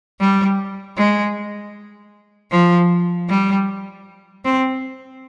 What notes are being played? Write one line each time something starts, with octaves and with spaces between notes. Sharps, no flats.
G3
G#3
F3
G3
C4